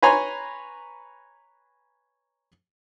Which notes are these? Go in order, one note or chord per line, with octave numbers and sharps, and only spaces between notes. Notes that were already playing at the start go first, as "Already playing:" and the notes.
B4 C#5 G#5 A#5 C6